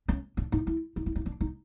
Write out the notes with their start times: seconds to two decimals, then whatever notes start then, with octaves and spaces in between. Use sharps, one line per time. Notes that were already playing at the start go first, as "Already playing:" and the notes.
0.08 C#4
0.37 D4
0.52 D#4
0.67 E4
0.96 D#4
1.06 E4
1.16 D#4
1.26 D4
1.41 D#4